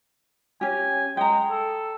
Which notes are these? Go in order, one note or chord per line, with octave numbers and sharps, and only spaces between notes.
C#4 G4 G#5
G#3 G5 A#5
A4